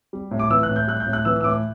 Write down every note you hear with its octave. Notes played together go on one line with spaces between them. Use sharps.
G3
A2
D6
E3 E6
F#6
A2
G6
G3 F#6
G6
A2
F#6
E3 E6
E6
A2 D6